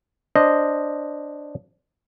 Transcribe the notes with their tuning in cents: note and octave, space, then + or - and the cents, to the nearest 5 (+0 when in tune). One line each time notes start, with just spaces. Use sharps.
D4 +0 C5 +0 D#5 -5